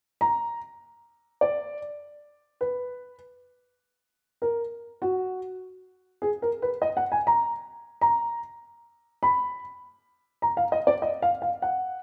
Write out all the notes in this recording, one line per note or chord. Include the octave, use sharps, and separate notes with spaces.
A#5
D5
B4
A#4
F#4
G#4
A#4
B4
D#5
F#5
G#5
A#5
A#5
B5
A#5
F5
D#5
D5
D#5
F5
F5
F#5